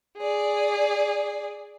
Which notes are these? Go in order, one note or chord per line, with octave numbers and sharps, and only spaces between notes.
G#4 D5